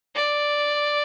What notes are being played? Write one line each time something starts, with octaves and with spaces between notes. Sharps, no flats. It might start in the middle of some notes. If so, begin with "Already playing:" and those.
D5